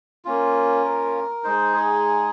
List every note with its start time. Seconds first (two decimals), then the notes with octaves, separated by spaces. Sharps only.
0.25 A#3 C#4 F4
0.85 A#4
1.44 G#3 D#4 C5
1.73 G#4